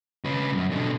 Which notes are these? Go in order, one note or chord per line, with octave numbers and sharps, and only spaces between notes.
C#3 B4
C2 F#2
B2 D3